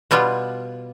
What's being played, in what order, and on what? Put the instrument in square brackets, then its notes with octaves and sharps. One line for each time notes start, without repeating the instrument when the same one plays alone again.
[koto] B2 G3 B3 F4